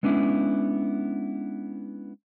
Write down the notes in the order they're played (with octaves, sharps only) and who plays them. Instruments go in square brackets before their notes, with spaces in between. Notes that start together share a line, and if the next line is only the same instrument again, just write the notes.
[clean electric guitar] G#3 B3 C#4 D4 E4